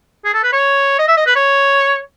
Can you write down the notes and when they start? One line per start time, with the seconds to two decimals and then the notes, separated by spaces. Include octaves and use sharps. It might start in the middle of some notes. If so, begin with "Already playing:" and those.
0.25 G#4
0.34 A4
0.43 B4
0.52 C#5
0.99 D#5
1.08 E5
1.17 D#5
1.26 B4
1.36 C#5